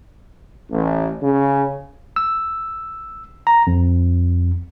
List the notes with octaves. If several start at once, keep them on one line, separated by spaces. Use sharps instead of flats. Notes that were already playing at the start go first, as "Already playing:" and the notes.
A1
C#3
E6
A#5
F2